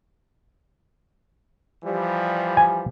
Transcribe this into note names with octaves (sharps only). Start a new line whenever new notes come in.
E3 F3 G3
G#5